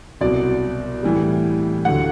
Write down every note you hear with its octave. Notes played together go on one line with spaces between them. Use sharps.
C2 B2 F#3 D5
A2 E3 G3
D2 D3 F#3 A3 F#5